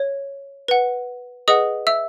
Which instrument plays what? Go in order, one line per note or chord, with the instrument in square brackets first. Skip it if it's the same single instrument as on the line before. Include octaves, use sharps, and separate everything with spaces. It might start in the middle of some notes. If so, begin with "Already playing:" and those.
Already playing: [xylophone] C#5
B4 F#5
G#4 B4 D#5 F#5 D#6
E5 E6